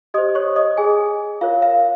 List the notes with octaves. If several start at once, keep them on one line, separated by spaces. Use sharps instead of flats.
G4 C5 D#5 D#6
C#5 C#6
D#5 D#6
G#4 G#5
F4 A#4 C#5 F5
F5